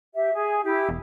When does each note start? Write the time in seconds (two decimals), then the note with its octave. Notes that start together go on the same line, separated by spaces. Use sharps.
0.13 G4 E5
0.34 G#4
0.63 E4 G4
0.89 E1